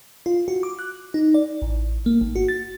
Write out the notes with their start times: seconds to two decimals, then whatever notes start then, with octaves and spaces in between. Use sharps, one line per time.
0.26 F4
0.48 F#4
0.63 D6
0.79 F#6
1.14 D#4
1.34 D5
1.62 A1
2.06 A#3
2.21 G#1
2.36 F#4
2.48 A6